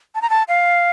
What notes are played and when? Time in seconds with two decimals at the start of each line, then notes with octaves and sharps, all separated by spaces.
0.15 A5
0.22 A#5
0.30 A5
0.48 F5